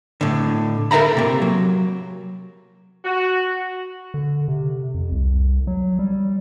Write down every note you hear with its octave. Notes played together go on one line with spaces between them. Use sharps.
A2 D3
A4 A#4 E5 A#5 B5
C3 A#3
F#3
F#4
D3
C3
F2
C2
F#3
G3